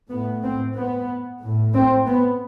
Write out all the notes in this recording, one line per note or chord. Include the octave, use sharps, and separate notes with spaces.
A2 B3
C4
B3
A2
C4
B3